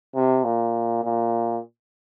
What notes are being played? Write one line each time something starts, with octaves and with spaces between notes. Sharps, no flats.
C3
A#2
A#2